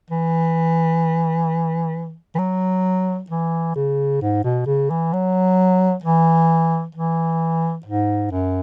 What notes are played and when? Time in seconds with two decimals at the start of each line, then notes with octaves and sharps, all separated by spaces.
0.10 E3
2.35 E3
2.38 F#3
3.30 E3
3.76 C#3
4.21 G#2
4.44 B2
4.66 C#3
4.90 E3
5.13 F#3
6.04 E3
6.95 E3
7.85 G#2
8.31 F#2